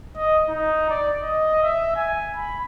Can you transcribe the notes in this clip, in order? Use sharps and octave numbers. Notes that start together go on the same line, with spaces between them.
D#5
D#4
D5
D#5
E5
G#5
B5